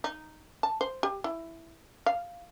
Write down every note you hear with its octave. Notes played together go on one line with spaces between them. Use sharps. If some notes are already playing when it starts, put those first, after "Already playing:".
D#4
A5
C5
G4
E4
F5